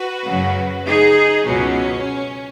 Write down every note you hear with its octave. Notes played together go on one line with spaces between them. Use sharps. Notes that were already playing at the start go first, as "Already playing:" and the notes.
Already playing: F#4 B4
F#2 C#3 F#3
D#4 G#4
C#2 B2 F#3 C#4